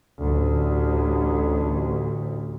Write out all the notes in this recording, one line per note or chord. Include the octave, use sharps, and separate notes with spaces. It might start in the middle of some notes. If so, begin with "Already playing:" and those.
A1 D2